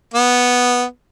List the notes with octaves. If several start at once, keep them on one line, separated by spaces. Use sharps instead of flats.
B3